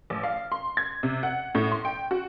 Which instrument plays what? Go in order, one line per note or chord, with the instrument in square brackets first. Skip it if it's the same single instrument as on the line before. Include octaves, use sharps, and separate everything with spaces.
[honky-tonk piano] A1
F5
C6
G#6
C3
F#5
A2
C6
G5
F#4